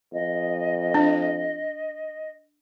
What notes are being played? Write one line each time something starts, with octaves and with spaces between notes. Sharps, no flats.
F2 D#5
D4